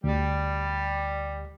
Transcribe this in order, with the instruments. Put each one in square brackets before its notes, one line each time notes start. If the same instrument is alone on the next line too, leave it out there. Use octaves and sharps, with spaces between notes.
[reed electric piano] D2 [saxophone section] G3